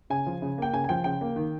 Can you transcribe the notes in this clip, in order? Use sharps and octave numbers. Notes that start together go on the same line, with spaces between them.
C#3 G#5
F3
C#3
A#3 G5
C#3 G#5
G#5
F3 G5
C#3 G5
A#3
D#3